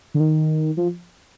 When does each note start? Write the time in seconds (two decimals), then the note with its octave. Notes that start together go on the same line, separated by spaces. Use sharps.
0.14 D3
0.20 D#3
0.77 F3